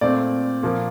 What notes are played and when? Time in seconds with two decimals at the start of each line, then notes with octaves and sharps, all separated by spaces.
0.01 A#2 A3 C4 D5
0.63 A#2 F3 A#3